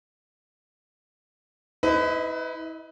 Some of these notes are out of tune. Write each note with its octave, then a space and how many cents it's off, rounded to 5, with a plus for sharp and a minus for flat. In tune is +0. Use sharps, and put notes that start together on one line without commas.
E4 -35 B4 +25 D#5 +0